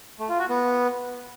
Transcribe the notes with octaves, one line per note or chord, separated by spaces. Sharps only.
A3
F4
F#4
B3